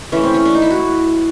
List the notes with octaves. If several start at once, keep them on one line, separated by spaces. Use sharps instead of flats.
E3 A3 C#4
C4
C#4
D4
D#4
E4
F#4